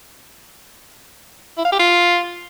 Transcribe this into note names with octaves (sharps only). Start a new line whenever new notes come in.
E4
F5
G4
F4